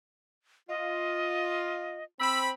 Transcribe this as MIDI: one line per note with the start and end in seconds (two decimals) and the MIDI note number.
0.69 2.02 65
0.69 2.04 75
2.20 2.51 60
2.20 2.51 83
2.20 2.41 88